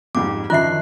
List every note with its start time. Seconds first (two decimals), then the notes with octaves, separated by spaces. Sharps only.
0.15 F2 G#2 G3 D6
0.50 F#2 D3 D#3 F3 F4 E5 F#6 C7